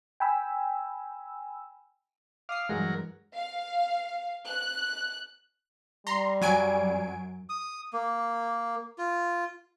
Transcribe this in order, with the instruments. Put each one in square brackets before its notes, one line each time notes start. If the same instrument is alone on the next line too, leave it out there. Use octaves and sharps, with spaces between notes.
[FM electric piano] G5 G#5 B5 E6
[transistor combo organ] F5 [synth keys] D6 D#6 C7
[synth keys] G2 E3 G#3 [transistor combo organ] F#3 A#4
[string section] F5
F#6
[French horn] G3 [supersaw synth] A#5 C6
[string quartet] F#2 [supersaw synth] F#3 G#5 D7
[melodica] D#6
A#3
F4